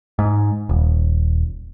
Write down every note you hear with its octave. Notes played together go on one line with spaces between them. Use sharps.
G#2
D#1